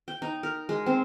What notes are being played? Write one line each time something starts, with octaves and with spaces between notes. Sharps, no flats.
G5
D#4
A#4
G#3
C4